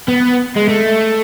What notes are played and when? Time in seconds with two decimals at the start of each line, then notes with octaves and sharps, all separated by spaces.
0.08 B3
0.56 G#3
0.69 A3